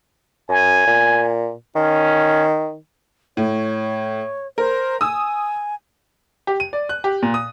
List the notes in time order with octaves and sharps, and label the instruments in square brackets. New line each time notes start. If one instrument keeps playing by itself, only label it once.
[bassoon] F#2 [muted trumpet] G#5
[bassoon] A#2
[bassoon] D#3 [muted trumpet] C#4
[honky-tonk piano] A2 [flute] C#5
[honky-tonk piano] A#4 [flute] C5
[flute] G#5 [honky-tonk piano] D#6 E6
[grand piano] G4
D#7
D5
F#6
G4
A#2
D#6